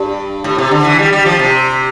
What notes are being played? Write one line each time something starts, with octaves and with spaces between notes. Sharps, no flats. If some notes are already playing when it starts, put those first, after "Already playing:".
Already playing: G2
A2
C3
D3
E3
G3
G3
F3
C3